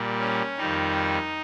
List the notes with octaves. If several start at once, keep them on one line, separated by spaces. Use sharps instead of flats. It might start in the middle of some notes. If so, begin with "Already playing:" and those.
Already playing: A#2 G3
C#4
F2 D#3 G3 D#4